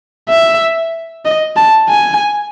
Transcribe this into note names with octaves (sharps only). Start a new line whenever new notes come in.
E5
D#5
A5
G#5